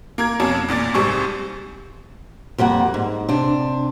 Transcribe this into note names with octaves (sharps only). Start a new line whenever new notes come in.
A#3 A#4 G#6
F2 B2 A#3 C#4 A5
E2 A#2 D5 A6
C2 G#2 G3 C4 G#4 C#6
F2 G3 A#3 F#5
G#2
C3 D4